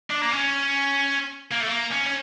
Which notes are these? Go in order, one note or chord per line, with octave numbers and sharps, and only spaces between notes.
D4
A#3
C#4
A#3
A3
A#3
C#4
C#4